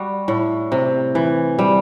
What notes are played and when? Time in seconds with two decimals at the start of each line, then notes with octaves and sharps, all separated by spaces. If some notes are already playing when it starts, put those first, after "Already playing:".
Already playing: G3 F#4
0.28 A2
0.72 C3
1.15 E3
1.59 G3